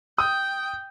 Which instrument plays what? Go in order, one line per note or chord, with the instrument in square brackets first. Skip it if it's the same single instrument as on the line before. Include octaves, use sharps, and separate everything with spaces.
[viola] G5 [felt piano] D#6